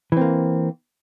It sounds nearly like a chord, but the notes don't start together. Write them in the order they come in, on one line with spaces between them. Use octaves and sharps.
E3 C4 A#3